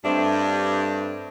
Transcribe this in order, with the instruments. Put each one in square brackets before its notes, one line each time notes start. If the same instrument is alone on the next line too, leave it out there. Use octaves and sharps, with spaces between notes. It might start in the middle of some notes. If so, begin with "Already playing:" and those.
[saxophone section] G2 [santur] A3 C4 D#5 [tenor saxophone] D4